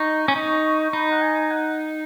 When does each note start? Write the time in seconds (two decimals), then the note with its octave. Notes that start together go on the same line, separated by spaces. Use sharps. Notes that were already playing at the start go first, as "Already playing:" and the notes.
Already playing: D#4 C#6
0.28 C#4
0.36 D#4
0.79 C#6
0.93 D#4 B5
1.11 F#5
1.22 G#5
1.51 F#5